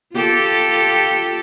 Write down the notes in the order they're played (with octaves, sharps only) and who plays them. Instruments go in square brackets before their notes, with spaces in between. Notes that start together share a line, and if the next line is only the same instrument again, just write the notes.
[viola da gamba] F4 G4 A4